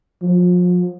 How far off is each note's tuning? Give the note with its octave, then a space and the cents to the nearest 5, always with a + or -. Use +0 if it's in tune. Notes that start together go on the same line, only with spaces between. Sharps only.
F3 +35